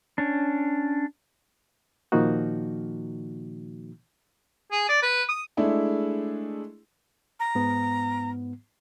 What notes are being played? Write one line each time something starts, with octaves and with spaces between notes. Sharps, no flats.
C#4 D4
A#2 D#3 F3 A#3 D#4 F#4
G#4
D5
B4
D#6
G#3 A3 D4 E4 G#4
A#5
G#2 B3